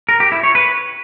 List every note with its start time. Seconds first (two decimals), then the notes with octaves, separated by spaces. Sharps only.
0.09 A#4
0.20 G4
0.32 E4
0.43 C#5
0.55 B4